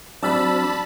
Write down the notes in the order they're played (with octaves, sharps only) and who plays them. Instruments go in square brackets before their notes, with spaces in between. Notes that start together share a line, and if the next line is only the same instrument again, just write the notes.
[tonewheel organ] F#3 C4 D4 [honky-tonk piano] D5 E6 F6 [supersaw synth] A5 B5